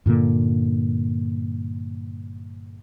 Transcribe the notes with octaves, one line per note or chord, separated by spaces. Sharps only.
G2 A#2 D3 A#3